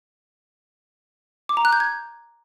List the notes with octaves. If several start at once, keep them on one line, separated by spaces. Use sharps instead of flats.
D6
A#5
F#6
G6
G#6